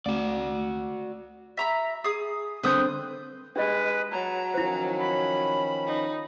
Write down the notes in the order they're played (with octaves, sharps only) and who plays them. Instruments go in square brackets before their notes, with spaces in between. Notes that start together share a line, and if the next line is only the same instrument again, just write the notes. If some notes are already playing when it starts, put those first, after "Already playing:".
[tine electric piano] C#2 [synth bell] A3 [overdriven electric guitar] F#4 D5
[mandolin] E5 A#5 B5
G#4 D#6
[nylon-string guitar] D3 C4 [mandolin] B4 D#6 G6
[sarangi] G#3 [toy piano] D4 G4 D#5 [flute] B4
[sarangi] F#3 [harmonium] A5 [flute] A#5
[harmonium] D#3 F3 C#4 [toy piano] E4 C5
[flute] B5
[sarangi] D#4